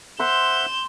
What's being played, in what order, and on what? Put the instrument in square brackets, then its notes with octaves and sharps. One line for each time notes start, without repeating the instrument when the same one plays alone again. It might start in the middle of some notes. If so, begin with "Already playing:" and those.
[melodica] C5 E5 F#5 [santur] C6 E6 [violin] G6 E7